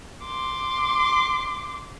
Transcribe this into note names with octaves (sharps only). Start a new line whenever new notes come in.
C6 D6